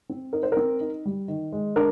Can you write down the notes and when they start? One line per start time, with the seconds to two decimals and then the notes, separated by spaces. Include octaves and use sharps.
0.09 C4
0.33 D#4 A#4
0.43 C5
0.52 C4 A#4
0.80 D#4
1.05 G3
1.28 D#3
1.53 G#3
1.76 D4 A#4